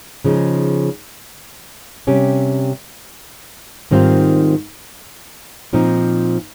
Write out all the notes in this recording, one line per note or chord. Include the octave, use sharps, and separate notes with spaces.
C#3 F3 G#3 D#4
C3 G3 C#4 G4
G#2 D#3 G3 C4 F4
A#2 F3 C4 D#4